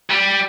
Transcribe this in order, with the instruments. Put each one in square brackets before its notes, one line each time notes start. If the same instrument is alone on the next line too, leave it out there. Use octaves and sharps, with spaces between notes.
[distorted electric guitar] G3